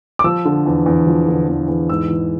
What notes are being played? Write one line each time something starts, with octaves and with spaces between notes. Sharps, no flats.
D6
F3 E6
D3
E2
E2
F3
D3
E2
E2
G#2 E6
E3